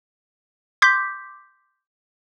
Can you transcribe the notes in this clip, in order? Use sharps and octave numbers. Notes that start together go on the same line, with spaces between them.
C6 D6 G6 B6